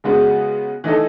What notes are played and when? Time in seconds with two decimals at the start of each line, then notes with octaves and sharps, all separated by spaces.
0.04 C#3 G#3 B3 F#4
0.84 E3 A3 D#4 A4